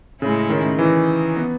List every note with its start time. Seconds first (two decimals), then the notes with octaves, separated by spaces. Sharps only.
0.21 A2 C#3 G#3 C#4 E4
0.50 D#3
0.79 E3
1.36 B3